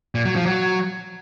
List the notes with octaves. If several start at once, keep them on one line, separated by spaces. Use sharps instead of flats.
A#2
F#3
F3
F#3